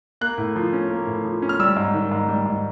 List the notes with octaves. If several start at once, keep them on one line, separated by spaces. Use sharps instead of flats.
A#3 F#6
A2
F3
C#4
A#3
A2
F3
C#4
F6
G3 E6
G#2
D#3
G#2
G3
G#2